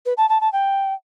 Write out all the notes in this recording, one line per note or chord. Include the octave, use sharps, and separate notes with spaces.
B4
A5
A5
A5
G5